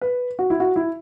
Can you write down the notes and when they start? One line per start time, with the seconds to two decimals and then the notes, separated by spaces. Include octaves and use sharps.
0.01 B4
0.39 F#4
0.50 E4
0.60 F#4
0.76 E4